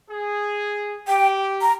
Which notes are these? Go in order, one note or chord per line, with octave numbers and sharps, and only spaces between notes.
G#4
G4 G5
A#5